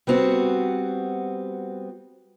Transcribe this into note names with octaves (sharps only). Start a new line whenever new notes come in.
G3 B3 C4 F#4